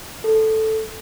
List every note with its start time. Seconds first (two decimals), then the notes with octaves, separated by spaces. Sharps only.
0.24 A4